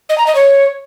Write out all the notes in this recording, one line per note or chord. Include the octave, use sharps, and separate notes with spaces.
D#5
A#5
D#5
C#5